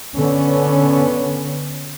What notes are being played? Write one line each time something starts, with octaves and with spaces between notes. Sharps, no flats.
D3 B3 C#4